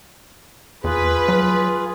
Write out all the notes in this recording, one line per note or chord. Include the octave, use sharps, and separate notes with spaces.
E2 F4 G#4 B4
F#3